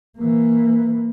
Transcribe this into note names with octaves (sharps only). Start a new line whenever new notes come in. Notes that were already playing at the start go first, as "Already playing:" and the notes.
E3 A#3